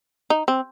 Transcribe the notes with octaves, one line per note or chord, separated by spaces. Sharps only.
D#4
C4